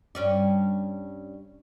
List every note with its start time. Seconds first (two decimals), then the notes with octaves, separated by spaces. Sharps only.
0.15 G2 C#4 D5